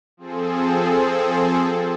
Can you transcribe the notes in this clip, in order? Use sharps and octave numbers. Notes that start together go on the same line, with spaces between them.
F3 C4 G#4 A4